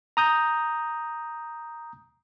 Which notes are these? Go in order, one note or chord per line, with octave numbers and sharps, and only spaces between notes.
A#5 D#6 G6